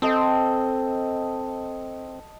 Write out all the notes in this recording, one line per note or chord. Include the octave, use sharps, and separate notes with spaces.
C4 A4 D#5